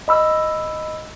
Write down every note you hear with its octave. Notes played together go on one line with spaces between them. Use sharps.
D#5 B5 E6